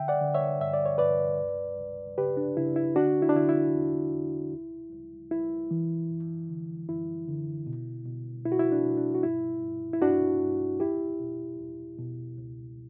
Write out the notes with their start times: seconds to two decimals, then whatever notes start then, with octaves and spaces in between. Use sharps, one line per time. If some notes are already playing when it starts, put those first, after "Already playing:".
Already playing: D3 E5 G5
0.08 D5 F#5
0.21 D3
0.34 C#5 E5
0.60 G2 E5
0.74 D5
0.86 C#5
0.98 G2 B4 D5
1.39 C#2
1.78 C#2
2.18 C#3 G4 B4
2.37 D4
2.57 C#3 E4
2.76 E4
2.96 D3 D4 F#4
3.22 E4
3.29 D4
3.35 D3 E4
3.49 E4
3.75 E2
4.13 E2
4.53 C#2
4.92 C#2
5.31 C#2 E4
5.71 E3
6.10 F#2
6.49 D3
6.89 F#2 E4
7.28 D3
7.67 B2
8.06 B2
8.45 B2 E4
8.52 F#4
8.59 E4
8.72 D4
8.84 B2
8.98 D4
9.15 F#4
9.23 G2 E4
9.63 G2
9.93 E4
10.02 G2 D4 F#4
10.41 G2
10.80 E2 E4 G4
11.20 B2
11.59 E2
11.99 B2
12.38 C#2